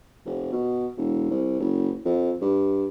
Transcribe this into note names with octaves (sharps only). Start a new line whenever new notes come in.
F1
B2
E1
C2
F#1
F2
G2